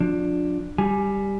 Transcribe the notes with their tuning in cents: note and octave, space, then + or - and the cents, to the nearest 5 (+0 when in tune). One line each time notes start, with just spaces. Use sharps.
F3 +25 D4 +5
G3 +5 G#5 +10